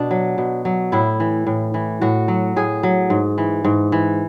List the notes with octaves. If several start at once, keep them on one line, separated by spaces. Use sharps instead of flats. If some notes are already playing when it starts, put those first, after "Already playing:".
Already playing: B2 D4
F#3
B2
F#3
A2 E4
E3
A2
E3
A2 F#4
F#3
A2 G#4
F#3
G#2
E3
G#2
E3